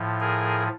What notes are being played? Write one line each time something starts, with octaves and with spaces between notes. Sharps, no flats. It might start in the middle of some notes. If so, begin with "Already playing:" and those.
Already playing: A2 F3
G#4 A#4